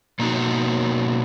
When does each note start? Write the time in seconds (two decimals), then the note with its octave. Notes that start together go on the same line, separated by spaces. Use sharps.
0.19 B2 A#3 D#4 F#4